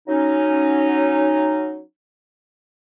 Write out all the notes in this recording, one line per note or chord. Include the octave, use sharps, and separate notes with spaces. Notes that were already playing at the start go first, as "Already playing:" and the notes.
F#3 C#4 D#4